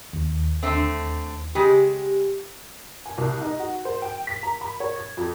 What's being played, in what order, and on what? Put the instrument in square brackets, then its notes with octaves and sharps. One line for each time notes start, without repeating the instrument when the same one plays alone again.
[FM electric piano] D#2
[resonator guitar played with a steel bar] D3 A3 C4
[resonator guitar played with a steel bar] C#3 G#3 [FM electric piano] G4
[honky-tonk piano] G#5
C2
D#4
F#4
C5
G5
B6
A#5
B5
C#5
G#6
F2